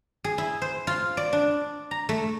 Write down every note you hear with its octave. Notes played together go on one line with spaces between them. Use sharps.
G#4
E4
C5
F4
D5
D4
A#5
A3